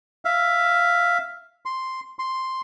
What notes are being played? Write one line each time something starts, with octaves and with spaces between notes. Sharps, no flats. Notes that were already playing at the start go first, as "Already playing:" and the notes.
E5 F5
C6
C6